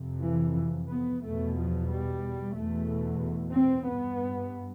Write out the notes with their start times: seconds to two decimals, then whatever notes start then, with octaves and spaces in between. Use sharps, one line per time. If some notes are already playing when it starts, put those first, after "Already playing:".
Already playing: F2 C3
0.22 E3
0.90 B3
1.23 E2 B2 A3
1.56 F3
1.89 G3
2.55 E2 B2 A3
3.55 C4
3.88 G2 B3